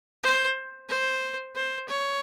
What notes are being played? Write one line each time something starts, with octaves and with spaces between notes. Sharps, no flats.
C5
C5
C5
C#5